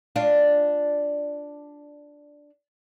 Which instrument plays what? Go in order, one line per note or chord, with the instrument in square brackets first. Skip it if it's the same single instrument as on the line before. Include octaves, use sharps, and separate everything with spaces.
[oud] D4 F4